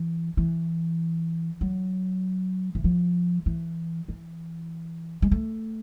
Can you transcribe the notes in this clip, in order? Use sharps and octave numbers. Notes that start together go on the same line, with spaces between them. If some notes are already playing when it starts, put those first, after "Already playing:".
Already playing: E3
E3
F#3
E3
F3
E3
E3
G#3
A3